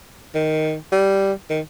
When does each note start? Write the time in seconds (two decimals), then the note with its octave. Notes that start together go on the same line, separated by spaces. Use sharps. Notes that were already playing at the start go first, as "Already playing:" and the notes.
0.35 D#3
0.92 G3
1.50 D#3